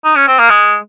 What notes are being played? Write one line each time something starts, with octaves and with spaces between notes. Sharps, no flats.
D#4
C#4
C4
A#3
G#3